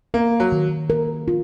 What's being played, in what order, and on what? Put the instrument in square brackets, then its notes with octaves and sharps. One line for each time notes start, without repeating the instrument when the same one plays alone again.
[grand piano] A#3 [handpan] A#4
[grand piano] F#3
[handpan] D#3
A#4
F4